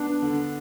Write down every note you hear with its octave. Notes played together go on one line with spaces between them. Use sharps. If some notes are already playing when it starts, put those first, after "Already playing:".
Already playing: B3 D4
D3